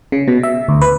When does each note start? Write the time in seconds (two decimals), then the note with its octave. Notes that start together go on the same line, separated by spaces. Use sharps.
0.12 C#3
0.28 B2
0.43 E5
0.68 D2
0.81 B4